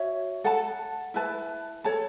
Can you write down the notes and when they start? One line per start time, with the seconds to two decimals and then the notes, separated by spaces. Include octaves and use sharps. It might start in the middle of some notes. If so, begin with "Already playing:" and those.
Already playing: F#4 C#5 E5
0.44 A4 F#5 A5
1.14 E4 B4 A5
1.84 A4 C#5 A5